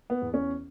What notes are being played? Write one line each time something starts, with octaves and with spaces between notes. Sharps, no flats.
B3
E2
C#4